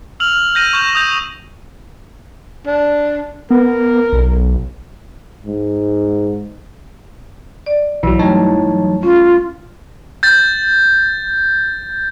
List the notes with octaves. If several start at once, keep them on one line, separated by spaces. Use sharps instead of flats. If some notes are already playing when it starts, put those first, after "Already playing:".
E6 F6 F7 F#7
G6 A#6 D#7
C#6 G6 E7
D#6 G6 F7
D4
B3 A#4
B1
G#2
D5
B1 G2 E3 F#3 E6
G3 A3 D#4 C#5 A5
C#4 F4
G6 A6